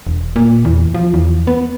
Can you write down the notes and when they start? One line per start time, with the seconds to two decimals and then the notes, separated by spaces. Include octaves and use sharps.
0.07 E1
0.36 A#2
0.65 E2
0.95 F3
1.14 E2
1.47 B3